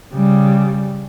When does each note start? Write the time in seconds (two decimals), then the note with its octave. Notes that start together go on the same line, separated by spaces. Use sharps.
0.14 C#3 G3